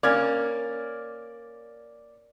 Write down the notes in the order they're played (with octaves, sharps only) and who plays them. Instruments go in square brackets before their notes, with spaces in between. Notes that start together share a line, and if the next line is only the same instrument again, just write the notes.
[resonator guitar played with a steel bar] A#3 C#4 [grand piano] D5 F6 G#6